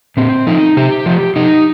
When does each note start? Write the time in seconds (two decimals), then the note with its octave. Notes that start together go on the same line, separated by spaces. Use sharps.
0.17 A#2 C4
0.47 F3 D#4
0.77 C3 G4
1.06 F3
1.36 C3 D#4